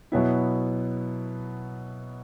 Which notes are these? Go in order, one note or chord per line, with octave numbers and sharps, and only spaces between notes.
B2 F#3 B3 E4